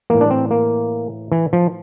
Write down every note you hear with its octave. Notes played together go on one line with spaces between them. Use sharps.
A2 E3 A#3
D4
C4
A#3
E3
F3